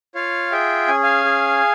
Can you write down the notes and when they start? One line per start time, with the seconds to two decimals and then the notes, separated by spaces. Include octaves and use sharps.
0.15 F4 C#5 F5
0.51 G#4 E5 G5
0.88 C#4 G#5
1.03 F5 G#5
1.25 G#4